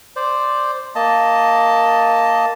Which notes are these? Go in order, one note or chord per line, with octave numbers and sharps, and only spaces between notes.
C5 D5
A#3 D#5 A5